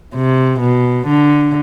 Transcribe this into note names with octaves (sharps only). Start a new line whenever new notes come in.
C3
B2
D3